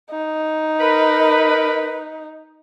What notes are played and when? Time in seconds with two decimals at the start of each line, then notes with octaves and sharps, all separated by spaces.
0.11 D#4
0.80 A#4 B4